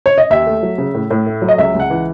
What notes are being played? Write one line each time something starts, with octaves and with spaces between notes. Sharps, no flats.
C#5
D#5
D#2 E5
A3
F#3
C#3
A2
A2
A3
F#3
D#5
C#2 E5
C#2
F#5
E3